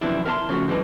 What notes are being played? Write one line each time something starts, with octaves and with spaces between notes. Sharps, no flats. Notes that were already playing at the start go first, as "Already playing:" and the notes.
F#2 C3 E3 F3 D4 E4
A#4 E5 F5 G#5 A5 C6
C#3 F3 A3 F#4
F#2 E3 G#3 D4 B4